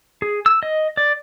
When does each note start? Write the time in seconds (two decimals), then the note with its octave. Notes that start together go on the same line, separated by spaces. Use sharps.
0.22 G#4
0.46 E6
0.63 D#5
0.97 D5